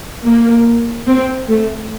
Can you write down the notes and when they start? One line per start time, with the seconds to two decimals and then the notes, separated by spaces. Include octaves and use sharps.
0.26 A#3
1.07 C4
1.48 A3